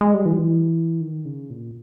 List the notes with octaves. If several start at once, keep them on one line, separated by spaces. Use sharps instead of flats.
G#3
G3
E3
G3
E3
D#3
C#3
A#2